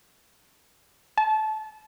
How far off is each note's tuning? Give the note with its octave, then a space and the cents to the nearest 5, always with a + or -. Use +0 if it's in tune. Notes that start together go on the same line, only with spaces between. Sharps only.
A5 -25